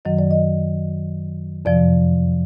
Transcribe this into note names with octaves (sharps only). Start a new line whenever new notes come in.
F#2 D#3 F#3 D#5
D5
D#5
F2 C3 F3 D5